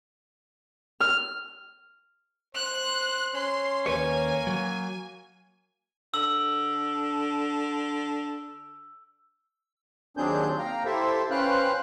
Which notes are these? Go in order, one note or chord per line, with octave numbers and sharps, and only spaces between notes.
F6
C5 F#6
C#4 C6
D#2 A#3 B4 C#5 G#5
F#3
D3 E6 F#7
D#2 F#3 C4 D4 G#4 G6
A#3 F5 G5 A#5
E4 G4 A4 C5 E5
C#4 B4 C5 F5 G5 F#6